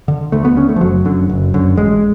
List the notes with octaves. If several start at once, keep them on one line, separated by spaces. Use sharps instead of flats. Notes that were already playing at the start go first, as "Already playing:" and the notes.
D3
D2 A3
B3
D3 C#4
A3
F3
F#1 F#3
F#2 D3
F#1
F#2 D3
A1 G#3